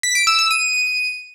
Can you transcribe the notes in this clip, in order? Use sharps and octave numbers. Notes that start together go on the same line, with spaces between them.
B6
D7
E6
E6
D#7